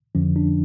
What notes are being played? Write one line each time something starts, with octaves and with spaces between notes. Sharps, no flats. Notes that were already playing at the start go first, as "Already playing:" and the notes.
F2 D3 F3 C#4
D4